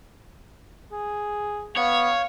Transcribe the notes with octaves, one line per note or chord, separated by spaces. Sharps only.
G#4
B3 C#5 F5